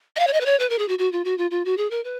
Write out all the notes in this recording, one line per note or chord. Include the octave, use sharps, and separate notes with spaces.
D#5
F5
C#5
D#5
B4
C#5
B4
A#4
G#4
F#4
F#4
F4
F#4
F4
F4
F#4
G#4
A#4
B4